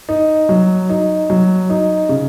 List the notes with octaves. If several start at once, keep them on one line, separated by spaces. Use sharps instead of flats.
D#4
F#3
D#4
F#3
D#4
C#3